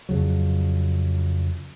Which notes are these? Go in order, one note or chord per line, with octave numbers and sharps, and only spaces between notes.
F2 C#3 F#3